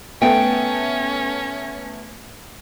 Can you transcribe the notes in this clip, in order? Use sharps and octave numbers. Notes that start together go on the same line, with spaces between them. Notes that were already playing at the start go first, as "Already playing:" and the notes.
A3 B3 C#4 G5